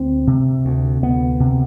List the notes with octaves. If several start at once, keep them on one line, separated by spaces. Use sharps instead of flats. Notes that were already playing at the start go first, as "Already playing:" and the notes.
Already playing: D2 C4
C3
D2
D2 B3
C3